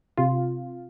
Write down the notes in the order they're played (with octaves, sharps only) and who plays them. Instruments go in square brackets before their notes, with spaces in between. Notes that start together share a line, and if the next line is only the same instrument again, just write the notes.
[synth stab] C3 F4